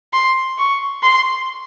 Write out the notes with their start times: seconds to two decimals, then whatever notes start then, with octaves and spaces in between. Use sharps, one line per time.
0.13 C6
0.58 C#6
1.03 C6